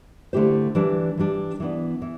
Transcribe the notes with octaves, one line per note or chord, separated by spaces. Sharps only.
D3 A3 E4 G4 C5
E3 G3 D4
E3 G3 D4
E3 B3 D4
E3